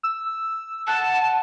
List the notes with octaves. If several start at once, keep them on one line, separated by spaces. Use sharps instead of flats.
E6
F#5 A5